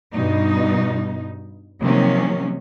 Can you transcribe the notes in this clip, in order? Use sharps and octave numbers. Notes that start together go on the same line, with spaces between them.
G2 B2 D#4
C3 D#3 F3 F#3 A#3 C#4